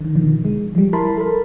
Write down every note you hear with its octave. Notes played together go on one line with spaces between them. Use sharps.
D3 D#3
B2 D#3 F3
G#3
F3 G3
E4 A#4 A5 B5 C6
A4 A#4